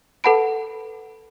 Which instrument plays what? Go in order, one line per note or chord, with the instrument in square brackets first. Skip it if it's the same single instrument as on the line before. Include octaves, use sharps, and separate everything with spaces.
[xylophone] A4 B4 F#5 A5 B5 D7